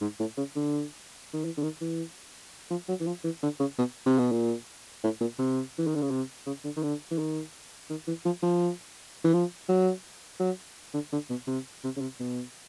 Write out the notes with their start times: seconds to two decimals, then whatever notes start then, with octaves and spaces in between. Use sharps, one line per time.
0.01 G#2
0.20 A2
0.37 C#3
0.56 D3
1.33 D#3
1.45 E3
1.57 D3
1.63 D#3
1.81 E3
2.70 F3
2.88 F#3
3.00 E3
3.07 F3
3.24 E3
3.43 D3
3.60 C#3
3.78 B2
4.06 C3
4.19 B2
4.32 A#2
5.04 A2
5.21 A#2
5.39 C3
5.78 E3
5.87 D#3
5.95 D3
6.02 C#3
6.10 C3
6.46 C#3
6.64 D3
6.76 D#3
6.83 D3
7.11 E3
7.19 D#3
7.90 D#3
8.07 E3
8.26 F3
8.43 F3
9.24 E3
9.33 F3
9.69 F#3
10.40 F#3
10.94 D3
11.12 D3
11.30 B2
11.47 C3
11.84 C3
11.97 C#3
12.01 C3
12.20 B2